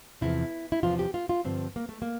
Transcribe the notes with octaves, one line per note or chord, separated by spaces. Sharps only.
E2 C3 F3 E4
E4
E2 C3 F3 F4
G4
F4
F4
G2 D3 F3 C4
A#3
A3
A#3